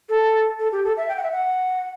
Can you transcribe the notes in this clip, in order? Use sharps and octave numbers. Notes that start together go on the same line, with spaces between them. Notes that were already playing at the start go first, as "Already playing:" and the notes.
A4
A4
G4
A4
E5
G5
F#5
E5
F#5